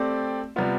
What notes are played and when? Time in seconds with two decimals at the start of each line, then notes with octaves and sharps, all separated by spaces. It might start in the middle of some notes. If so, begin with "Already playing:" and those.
Already playing: A3 C4 G4 D5
0.56 C3 G3 B3 F4